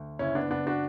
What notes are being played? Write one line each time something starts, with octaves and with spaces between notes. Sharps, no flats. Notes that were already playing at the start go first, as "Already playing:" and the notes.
Already playing: D2
F#1 C#4 E4
B3 D4
F#1 B3 D4
D4 F#4